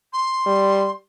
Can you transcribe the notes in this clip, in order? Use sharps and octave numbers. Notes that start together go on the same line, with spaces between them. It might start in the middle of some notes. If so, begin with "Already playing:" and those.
C6
G3